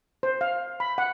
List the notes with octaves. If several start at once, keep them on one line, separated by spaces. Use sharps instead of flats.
C5
F5
B5
F#5